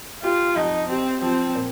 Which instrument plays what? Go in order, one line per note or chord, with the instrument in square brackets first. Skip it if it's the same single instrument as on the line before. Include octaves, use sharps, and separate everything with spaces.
[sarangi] F4 [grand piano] G4
[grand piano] F2 [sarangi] D#4
[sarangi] C4 [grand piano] G4
[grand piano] F3 [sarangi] C4
[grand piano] A#2